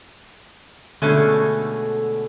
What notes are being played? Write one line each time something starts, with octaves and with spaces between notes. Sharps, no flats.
B2 D3 G#3 A3 C#4 A4